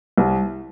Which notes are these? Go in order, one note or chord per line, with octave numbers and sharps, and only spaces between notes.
C2